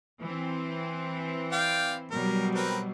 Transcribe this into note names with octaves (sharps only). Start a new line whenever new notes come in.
E3 C4
D5 F5 G5
B2 F#3 G3 A#4
C4 A#4 B4